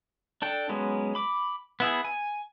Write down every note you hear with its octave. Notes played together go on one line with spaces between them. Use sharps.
D4 A4 G5
F#3 G#3 B3 C#4
B5 D6
B3 E4 G#4
G#5